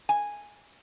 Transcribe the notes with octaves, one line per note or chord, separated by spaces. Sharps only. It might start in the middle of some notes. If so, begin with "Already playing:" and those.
G#5